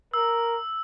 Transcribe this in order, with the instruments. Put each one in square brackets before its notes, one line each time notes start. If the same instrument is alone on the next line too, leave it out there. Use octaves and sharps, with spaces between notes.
[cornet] A#4 [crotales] E6